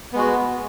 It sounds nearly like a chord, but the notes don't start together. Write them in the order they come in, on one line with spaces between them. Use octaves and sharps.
B3 G#3 F#4